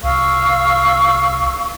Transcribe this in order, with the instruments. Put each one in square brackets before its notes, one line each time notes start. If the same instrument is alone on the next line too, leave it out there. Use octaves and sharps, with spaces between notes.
[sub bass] C2 [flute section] F5 C#6 E6